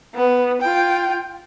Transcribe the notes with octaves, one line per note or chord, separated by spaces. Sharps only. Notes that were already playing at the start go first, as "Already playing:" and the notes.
B3
F4 G5